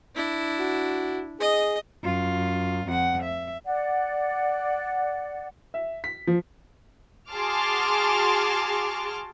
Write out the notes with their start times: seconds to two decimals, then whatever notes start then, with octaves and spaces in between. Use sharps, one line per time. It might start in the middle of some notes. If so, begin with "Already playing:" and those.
0.15 D4 E4
0.59 F#4
1.40 G#4 D#5
2.04 F#2 F4
2.86 F2 F#5
3.23 E5
3.65 D5 F#5
5.74 E5
6.04 B6
6.27 F3
7.30 F#4 G#4 A5 C6 D6 F6